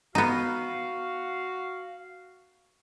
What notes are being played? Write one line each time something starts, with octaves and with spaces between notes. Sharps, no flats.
B3 D#4 F#4 F5